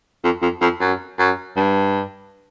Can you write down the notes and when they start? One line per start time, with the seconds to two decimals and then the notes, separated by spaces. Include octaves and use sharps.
0.24 F2
0.42 F2
0.62 F2
0.81 F#2
1.19 F#2
1.56 G2